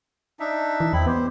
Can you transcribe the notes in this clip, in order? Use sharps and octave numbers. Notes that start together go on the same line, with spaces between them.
D4 D#4 E5
E3
E2 C4 E4 B5
B3 G4 C5